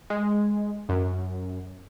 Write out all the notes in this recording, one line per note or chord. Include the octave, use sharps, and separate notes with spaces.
G#3
F#2